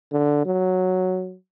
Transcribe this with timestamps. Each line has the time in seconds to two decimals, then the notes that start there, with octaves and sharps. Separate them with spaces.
0.12 D3
0.46 F#3